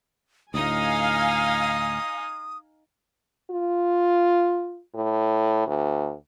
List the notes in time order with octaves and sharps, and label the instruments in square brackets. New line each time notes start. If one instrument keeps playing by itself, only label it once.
[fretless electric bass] D2 A2 [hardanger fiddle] D#4 D#5 [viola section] F5 G#5 [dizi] D#6
[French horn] F4
A2
D2